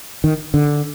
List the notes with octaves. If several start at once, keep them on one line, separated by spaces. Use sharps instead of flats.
D#3
D3